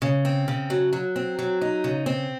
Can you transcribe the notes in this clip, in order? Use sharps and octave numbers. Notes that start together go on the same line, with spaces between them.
C#3
C4
C#3
F#3
F#3
C4
F#3
D#4
C#3
C4